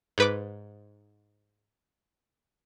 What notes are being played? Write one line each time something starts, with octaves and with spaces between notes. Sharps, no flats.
G#2 B4 D6